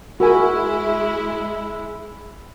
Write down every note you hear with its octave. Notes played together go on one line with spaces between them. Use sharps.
G#3 E4 F#4 G#4 A#4 G#5 B5 E6